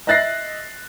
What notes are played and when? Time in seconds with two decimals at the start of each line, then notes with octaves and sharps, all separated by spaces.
0.07 D#5 E5 F#6 A6 A#6 C7